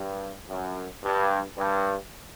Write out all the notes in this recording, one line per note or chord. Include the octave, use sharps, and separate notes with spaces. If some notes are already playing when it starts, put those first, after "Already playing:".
Already playing: G2
F#2
G2
G2